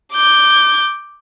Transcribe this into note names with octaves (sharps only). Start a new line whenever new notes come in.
D6 G6